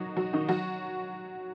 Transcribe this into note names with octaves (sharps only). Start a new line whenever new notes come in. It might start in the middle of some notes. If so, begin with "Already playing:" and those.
Already playing: D#3 F#3 D#4 F#4
F#3 F#4
D#3 D#4
F#3 F#4